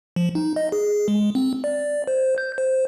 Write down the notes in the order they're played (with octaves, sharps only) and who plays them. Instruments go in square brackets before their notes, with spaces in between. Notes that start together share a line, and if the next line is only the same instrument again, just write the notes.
[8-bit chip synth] F3
D#4
D#5
G#4
G#3
C4
D5
C5
G6
C5